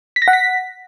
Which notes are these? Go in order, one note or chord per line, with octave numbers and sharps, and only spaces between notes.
B6
A#6
F#5
B6